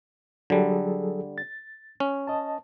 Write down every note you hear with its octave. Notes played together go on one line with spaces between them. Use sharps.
D3 F#3 G3 G#4 A4
A6
C#4
D#5 A5